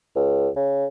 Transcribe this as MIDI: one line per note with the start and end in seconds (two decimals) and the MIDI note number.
0.16 0.49 37
0.56 0.86 49